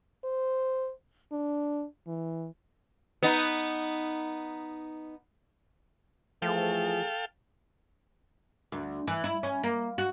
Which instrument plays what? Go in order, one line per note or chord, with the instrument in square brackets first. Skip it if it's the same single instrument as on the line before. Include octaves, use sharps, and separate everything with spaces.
[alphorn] C5
D4
E3
[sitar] B3 D#4
[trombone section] E3 A3 G#4 [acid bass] F3 [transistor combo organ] A4 F5 G5
[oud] D2
E3
E4
C#4
A#3
F#4